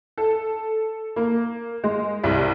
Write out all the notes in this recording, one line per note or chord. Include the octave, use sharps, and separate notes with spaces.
A4
A#3
G#3
C2